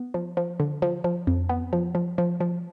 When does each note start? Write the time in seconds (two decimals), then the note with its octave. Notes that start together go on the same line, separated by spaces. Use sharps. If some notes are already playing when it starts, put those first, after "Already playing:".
Already playing: B3
0.14 F3
0.37 F3
0.60 D3
0.82 F3
1.04 F3
1.27 F2
1.49 B3
1.73 F3
1.95 F3
2.18 F3
2.40 F3